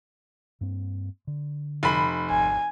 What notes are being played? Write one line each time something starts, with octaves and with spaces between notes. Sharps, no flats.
G2 A#3 C4
D3
F1 B5
G#1 G#5